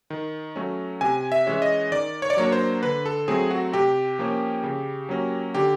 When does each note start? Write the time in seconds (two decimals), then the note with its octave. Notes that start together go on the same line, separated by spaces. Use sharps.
0.10 D#3
0.56 F#3 A3 C#4
1.01 C3 G#5
1.32 E5
1.47 E3 G#3 C#4
1.62 D#5
1.92 D#3 D5
2.22 C#5
2.30 D5
2.37 F#3 A#3 D4 C#5
2.52 C5
2.83 D3 B4
3.06 A4
3.28 F#3 A3 C4 G#4
3.51 F#4
3.73 C3 G4
4.19 F3 A#3 C#4
4.64 C#3
5.09 F#3 A#3 C#4
5.54 D3 G4